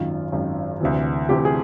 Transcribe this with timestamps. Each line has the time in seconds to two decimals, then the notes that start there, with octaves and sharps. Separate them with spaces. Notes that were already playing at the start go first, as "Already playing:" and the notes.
Already playing: G#1 F#2 D#3 F4
0.32 G#1 F#2 D#3
0.80 D2 C3 E3
1.29 D2 C3 E3 G4
1.45 G#4